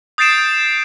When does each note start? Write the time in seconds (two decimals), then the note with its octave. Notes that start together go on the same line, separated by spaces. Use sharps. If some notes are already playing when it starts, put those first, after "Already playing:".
0.18 D#6 G6 A6 C7 D7 E7